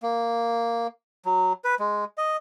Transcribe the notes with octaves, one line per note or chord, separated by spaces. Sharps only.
A#3
F#3
B4
G#3
D#5